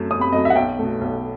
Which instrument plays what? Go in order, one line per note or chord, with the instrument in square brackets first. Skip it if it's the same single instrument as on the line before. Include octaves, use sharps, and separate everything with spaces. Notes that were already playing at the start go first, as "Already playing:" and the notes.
Already playing: [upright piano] F#2 F#3 A3
F#2 D#6
B5
F#3 A3 D#5
E5
F#5
B1 G5
B2 A3
B1